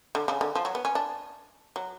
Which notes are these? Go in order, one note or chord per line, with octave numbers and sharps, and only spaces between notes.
D3
C#3
D3
F3
F#3
B3
C#4
D4
F#3